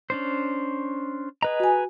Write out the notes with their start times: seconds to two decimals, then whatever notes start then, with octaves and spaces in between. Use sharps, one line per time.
0.10 C#4 D4 C5
1.43 G#4 B4 D#5 A#5
1.60 F#4 G#5